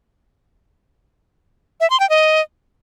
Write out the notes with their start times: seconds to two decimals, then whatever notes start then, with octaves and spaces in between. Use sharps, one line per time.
1.81 E5
1.90 C6
2.00 G5
2.10 D#5